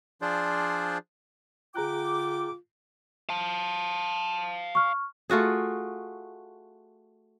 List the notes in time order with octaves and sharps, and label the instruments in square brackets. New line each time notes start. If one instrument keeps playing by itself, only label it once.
[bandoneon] F3 D4 F4 G#4 C5 D5
[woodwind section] D3 G5 D6 [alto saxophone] F4 [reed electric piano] G#4 A#5 F#6
[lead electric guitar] F5 A5
[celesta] C#6 F6
[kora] A3 F4 F#4 G#4